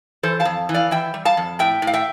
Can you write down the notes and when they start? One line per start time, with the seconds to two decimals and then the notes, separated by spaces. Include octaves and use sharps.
0.23 E3 A4 C5
0.40 F5 A5
0.45 F2
0.69 E3
0.74 D5 F5
0.91 E3 E5 G5
1.14 G3
1.25 F5 A5
1.37 F2
1.59 A2 E5 G5
1.82 A2
1.87 F5
1.94 E5 G5